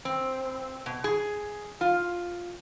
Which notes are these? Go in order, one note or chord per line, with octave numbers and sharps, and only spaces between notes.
C4
B2
G#4
F4